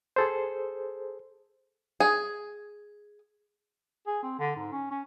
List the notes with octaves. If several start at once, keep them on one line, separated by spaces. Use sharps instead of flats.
G#4 A4 C5
G#4
G#4
C4
D3
G#2
C#4
C#4